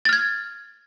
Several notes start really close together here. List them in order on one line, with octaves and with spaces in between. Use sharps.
A6 F6 G#6